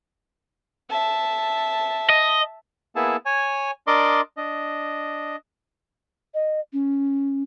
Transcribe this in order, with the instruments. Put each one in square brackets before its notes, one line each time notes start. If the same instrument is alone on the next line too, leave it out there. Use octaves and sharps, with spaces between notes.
[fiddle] E5 A5
[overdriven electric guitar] D#5
[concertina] A#3 B3 E4 G#4 E5 A5
C#5 G#5
D4 A#4 D5 D#5 C6 D6
D4 D#5
[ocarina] D#5
C#4